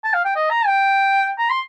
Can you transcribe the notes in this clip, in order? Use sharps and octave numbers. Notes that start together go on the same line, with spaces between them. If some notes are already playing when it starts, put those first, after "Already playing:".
A5
F5
G5
D#5
A#5
G5
A#5
C6